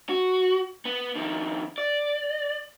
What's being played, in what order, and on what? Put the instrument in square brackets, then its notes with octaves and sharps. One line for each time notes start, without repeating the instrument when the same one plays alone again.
[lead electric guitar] F#4
B3
F2 D#3
D5